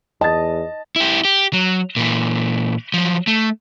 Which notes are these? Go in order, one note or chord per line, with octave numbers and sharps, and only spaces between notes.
E2 D#5 A5 A6
E4 G4
G4
F#3
A#2 E3
F3 F#3
A3